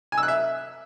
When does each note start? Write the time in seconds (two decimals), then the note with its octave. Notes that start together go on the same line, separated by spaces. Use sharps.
0.12 G#5
0.18 E6
0.23 F#6
0.28 E5